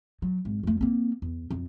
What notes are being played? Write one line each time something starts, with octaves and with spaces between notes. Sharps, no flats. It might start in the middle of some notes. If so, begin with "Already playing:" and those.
F#3
G#1
F2 A3
A#3 C4
E2
F2